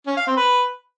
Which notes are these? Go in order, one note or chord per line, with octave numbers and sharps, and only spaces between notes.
C#4
F5
C4
B4